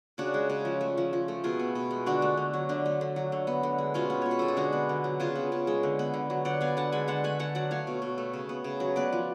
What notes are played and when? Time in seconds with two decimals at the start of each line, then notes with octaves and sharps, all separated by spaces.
0.18 C#3 D4 F#4
0.34 G#3
0.50 C#3
0.65 F3
0.81 A3
0.97 F3
1.13 F3
1.28 A3
1.44 B2 F4 G#4
1.59 B3
1.75 B2
1.91 G#3
2.06 D3 D4 F#4
2.22 A3
2.37 D3
2.53 F#3
2.69 D3 D4
2.86 A3
3.01 D3
3.16 F#3
3.32 D3
3.47 B3
3.63 D3
3.78 G#3
3.94 B2 C#4 F4
4.10 B3
4.22 B2 C#5
4.31 B4
4.39 G#3 A4
4.48 G#4
4.57 D3 D4 F#4
4.73 B3
4.89 D3
5.04 F#3
5.20 C#3 F4 G#4
5.35 B3
5.52 C#3
5.67 G#3
5.83 D3
5.99 B3
6.14 D3
6.30 F#3
6.45 D3 D5 F#5
6.61 B3 F5 G#5
6.77 D3 F#5 A5
6.92 G#3 G#5 B5
7.08 D3 F#5 A5
7.24 A3 G#5 B5
7.39 D3 F#5 A5
7.55 F#3 D5 F#5
7.71 A3 C#5 F5
7.87 B2
8.02 B2
8.18 A3
8.33 C#3
8.49 B3
8.64 C#3
8.80 F#3
8.96 B3 B4 D5
9.13 F3